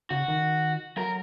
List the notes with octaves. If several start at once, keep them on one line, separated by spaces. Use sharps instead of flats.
C#3 F#4
D#3
F#3 A#4